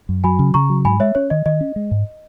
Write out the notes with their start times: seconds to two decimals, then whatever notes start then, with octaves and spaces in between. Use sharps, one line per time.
0.09 F#2
0.24 F#3 G#5 B5
0.39 C#3
0.54 C#3 A#5 C#6
0.70 F#3
0.85 G#2 G#5 B5
1.00 G#3 C#5 E5
1.15 C#4 C#5
1.30 D#3 D#5
1.46 D#3 D#5
1.61 C#4
1.76 G#3
1.91 G#2